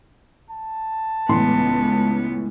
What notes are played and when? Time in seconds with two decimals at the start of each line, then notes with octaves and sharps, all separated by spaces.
0.51 A5
1.29 C#2 A2 E3 B3 C6